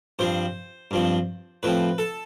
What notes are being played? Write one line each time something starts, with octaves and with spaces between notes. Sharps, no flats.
G2 F3 C4 C5
G2 F3 C4
A2 F3 C4 B4
A4